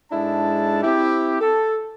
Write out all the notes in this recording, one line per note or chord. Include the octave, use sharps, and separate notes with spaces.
G#2 G#3 D4 E4 A4 A5
C4 E4 G4
A4